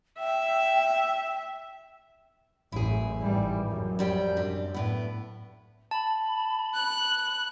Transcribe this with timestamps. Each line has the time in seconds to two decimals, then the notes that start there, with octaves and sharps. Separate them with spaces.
0.19 E5 G5
2.72 A1 F#2 E4 G#4
3.22 G#1 E3 G3
3.66 F#2
3.99 F2 G3 G5
4.37 C3 D4
4.74 A2 B3
5.91 A5 B5
6.74 F#6